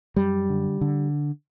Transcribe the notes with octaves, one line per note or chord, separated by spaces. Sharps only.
F#2 G3
D3
D3